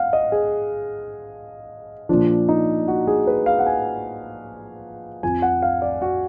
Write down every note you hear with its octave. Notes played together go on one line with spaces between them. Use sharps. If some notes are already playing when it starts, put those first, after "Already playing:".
Already playing: F5 F#5
D#5
G#4
A#2 F3 D4
D#4
F#4
G#4
B4
F5
F#5
G#5
F2 F3 G#5
F#5
F5
D5
F#4